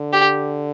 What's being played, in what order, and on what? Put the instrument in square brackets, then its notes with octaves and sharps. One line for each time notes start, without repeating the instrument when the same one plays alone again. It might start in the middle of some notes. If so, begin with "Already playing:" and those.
Already playing: [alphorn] D3
[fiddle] G4